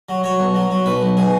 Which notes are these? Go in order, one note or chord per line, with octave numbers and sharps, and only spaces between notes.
F#3
F#3 C#5
B1
F#3
F#3
B1 B4
B1
B2 G#4